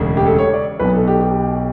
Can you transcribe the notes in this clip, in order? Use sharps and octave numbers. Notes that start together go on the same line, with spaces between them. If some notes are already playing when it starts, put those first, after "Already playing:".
Already playing: E1 D2 C#3
G4
A4
C#5
D5
B1 B2 B4
A4
G4
G4